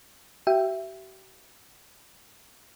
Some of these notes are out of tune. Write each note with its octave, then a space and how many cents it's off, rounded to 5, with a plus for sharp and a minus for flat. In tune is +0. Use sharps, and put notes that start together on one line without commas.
G4 -45 E5 +15 G5 -5